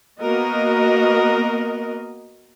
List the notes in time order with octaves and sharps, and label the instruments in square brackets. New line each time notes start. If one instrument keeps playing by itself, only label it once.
[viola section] A#3 B3 F#4 A#4 D#5